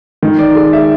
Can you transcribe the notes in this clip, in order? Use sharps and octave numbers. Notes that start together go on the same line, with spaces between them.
D#3
D5
G#3
E5